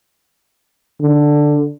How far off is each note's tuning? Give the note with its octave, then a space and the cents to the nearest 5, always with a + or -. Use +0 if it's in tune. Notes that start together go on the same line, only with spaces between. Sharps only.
D3 +5